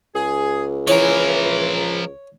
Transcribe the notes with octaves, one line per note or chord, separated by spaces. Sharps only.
C#2 G#4
E3 F3 A#4 C#5